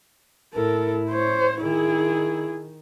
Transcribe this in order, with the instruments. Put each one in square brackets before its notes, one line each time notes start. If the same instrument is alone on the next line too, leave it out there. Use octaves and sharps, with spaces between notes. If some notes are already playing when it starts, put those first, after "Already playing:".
[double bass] A2 E4 [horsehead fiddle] A4 A#4
[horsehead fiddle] C5 C#5
[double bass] D#3 [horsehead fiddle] E4 G#4